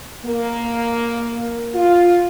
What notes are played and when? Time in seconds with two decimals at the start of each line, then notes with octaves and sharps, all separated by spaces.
0.25 A#3
1.74 F4